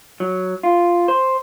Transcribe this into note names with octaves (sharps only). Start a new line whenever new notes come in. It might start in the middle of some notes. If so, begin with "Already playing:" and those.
F#3
F4
C5